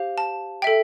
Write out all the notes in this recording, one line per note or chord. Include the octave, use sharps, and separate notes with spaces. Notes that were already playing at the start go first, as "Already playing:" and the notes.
Already playing: G4 C5 F5
A5
A4 E5 G5